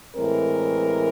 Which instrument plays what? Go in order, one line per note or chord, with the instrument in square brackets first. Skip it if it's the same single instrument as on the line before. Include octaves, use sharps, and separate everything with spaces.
[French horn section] A2 E3 G#3 C4 A#4